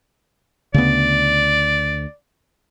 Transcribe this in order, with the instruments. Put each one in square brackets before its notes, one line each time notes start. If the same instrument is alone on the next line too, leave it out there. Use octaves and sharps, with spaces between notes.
[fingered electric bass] D2 [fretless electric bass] C#3 B3 [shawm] D5